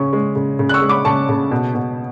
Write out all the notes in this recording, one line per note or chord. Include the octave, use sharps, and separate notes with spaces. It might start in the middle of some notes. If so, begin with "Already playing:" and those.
Already playing: C#3 C#4 C#6
G#3
C#3
C#3
F#6
C#6 E6
G#3
B5 D6
C#3 A5 C#6
C#3
B2
B2